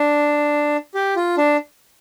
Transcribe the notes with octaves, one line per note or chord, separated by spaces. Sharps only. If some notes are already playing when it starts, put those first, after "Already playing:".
Already playing: D4
G4
F4
D4